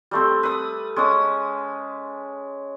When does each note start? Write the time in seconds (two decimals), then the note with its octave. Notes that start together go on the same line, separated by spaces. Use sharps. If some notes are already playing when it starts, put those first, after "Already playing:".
0.11 G3 A3 C4
0.43 B4 D#6
0.96 G#3 C#4 A5 D#6